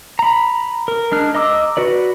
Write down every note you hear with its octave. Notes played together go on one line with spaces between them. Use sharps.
A#5 B5
A#4
G#3 D4 F6 F#6
D#5 A#5 D6 E6
F#4 B4 D5